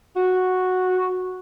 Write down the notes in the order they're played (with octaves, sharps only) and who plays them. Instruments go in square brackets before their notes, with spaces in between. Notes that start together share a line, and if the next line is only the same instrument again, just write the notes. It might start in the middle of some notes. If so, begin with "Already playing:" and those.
[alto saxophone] F#4